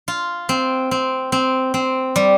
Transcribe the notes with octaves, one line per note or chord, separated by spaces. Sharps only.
F4
C4
C4
C4
C4
G3